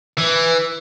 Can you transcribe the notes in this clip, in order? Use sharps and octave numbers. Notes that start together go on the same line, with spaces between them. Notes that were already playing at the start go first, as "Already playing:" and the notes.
E3